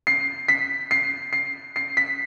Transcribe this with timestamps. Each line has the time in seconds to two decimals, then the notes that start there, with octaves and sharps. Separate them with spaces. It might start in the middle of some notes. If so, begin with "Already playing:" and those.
0.07 C7
0.48 B6
0.91 C7
1.33 C7
1.76 C7
1.97 B6